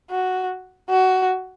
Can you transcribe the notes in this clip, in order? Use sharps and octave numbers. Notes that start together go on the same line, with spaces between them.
F#4
F#4